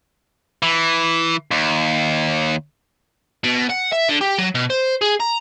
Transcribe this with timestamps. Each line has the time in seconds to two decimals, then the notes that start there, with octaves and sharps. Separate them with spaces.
0.63 E3
1.51 D#2
3.44 B2
3.70 F#5
3.93 E5
4.09 D3
4.21 G4
4.38 F#3
4.55 B2
4.70 C5
5.02 G#4
5.20 A#5